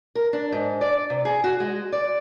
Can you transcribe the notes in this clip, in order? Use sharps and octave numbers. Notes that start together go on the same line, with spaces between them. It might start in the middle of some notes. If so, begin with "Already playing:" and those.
A#4
D4
G#2
D5
C3
G#4
F#4
G#3
D5